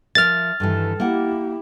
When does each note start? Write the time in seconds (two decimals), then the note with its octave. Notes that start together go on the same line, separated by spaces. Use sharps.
0.15 F3 A#4 E5 F6 A6
0.60 G2 D#3 E3 A4
1.00 A#3 E4 G4 F#5